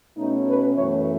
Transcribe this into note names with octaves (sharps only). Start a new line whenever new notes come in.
B2 A3 C#4 D#4
B4
F#2 E3 A3 C#5